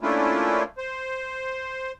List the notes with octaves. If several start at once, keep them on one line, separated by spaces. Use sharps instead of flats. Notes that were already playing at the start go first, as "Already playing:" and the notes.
A3 A#3 C#4 D4 E4 F4
C5